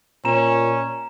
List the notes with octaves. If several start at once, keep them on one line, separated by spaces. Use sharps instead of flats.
A#2 C#4 A#5 E7